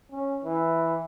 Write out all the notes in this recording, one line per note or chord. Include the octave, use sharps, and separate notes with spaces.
C#4
E3